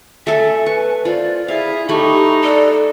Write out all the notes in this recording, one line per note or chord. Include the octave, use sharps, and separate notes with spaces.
A3 A4 E5 G#5
B4 C#6
F4 C5 D5
E4 G#4 E5 F5
A3 D#4 G4 B5 C#6
A4 D5